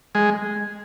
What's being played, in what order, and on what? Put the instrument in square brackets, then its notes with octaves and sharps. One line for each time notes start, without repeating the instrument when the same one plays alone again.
[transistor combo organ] G#3